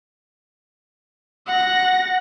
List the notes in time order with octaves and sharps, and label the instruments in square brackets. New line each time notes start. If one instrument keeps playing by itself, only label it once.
[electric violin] F#5 A#6